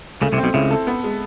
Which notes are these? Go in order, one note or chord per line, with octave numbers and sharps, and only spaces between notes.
C#2 C#3 A3
C2 C3
C4
B1 B2
C#2 C#3 E4
A4
B3
G#3